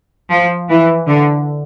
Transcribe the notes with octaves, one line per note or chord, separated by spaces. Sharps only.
F3
E3
D3